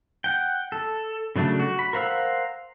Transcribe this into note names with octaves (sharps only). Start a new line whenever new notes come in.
F#5 G5
A4
C#3 F#3 A3 D4
F#4
B5
A#4 C5 F5 F#5 E6